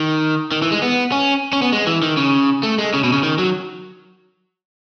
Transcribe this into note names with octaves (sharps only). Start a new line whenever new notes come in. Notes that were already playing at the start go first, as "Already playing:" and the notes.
Already playing: D#3
D#3
E3
G#3
B3
C#4
C#4
B3
G#3
E3
D#3
C#3
A3
G#3
C#3
B2
C#3
D#3
F#3